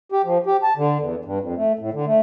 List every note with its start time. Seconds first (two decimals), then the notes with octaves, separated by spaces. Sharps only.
0.12 G4
0.25 F3
0.46 G4
0.63 A5
0.77 D3
1.00 E2
1.25 G2
1.41 F2
1.57 A3
1.79 A2
1.93 D3
2.06 A3